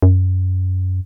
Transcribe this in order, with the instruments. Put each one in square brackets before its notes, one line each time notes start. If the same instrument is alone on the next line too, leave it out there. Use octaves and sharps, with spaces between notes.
[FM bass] F#2